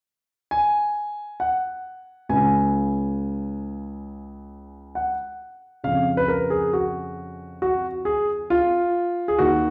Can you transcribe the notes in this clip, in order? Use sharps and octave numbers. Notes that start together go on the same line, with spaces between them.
G#5
F#5
C#2 C#3 G#5
F#5
F2 C#3 F5
B4
A#4
G#4
F#4
F#4
G#4
F4
G#4
D#2 D#3 F#4